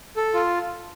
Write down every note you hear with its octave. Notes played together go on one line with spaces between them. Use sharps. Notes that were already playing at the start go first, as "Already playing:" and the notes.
A4
F4